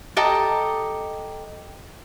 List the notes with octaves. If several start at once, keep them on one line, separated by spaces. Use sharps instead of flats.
G4 A4 D#5 A#5